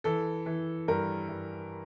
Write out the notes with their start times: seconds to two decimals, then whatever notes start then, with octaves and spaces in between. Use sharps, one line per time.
0.04 E3 A4
0.46 E3
0.88 G2 A#4
1.29 G2